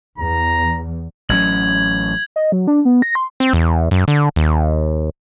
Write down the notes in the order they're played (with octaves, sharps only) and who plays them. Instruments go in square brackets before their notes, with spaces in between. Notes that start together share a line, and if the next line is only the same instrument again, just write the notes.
[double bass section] E2 [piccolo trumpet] A#5
[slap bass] A1 F#3 C#4 [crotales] G#6 F#7
[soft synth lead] D#5
F#3
D4
B3
A#6
C6
[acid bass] C4
E2
F#2
D3
D#2